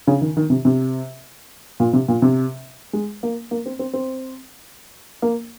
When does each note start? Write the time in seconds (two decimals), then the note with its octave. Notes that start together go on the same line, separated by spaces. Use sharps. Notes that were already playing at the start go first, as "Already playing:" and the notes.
0.07 C#3
0.21 D#3
0.37 D#3
0.50 C3
0.65 C3
1.80 A#2
1.93 C3
2.08 A#2
2.22 C3
2.93 G#3
3.23 A#3
3.51 A#3
3.66 C4
3.79 C4
3.93 C4
5.22 A#3